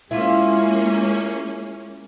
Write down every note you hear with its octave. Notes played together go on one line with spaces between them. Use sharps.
G#3 A#3 C#4 E4 F4